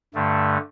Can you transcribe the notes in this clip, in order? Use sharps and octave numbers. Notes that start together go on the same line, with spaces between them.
G2 D3 A3